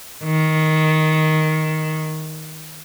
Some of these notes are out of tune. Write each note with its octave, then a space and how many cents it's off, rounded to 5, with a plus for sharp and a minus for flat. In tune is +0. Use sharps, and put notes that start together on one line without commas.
D#3 +10